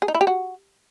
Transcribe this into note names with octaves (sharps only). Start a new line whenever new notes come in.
G#4
D#4
E4
G4
F#4